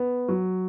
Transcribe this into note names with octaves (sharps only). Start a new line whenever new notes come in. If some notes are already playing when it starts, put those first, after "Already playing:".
Already playing: B3
F#3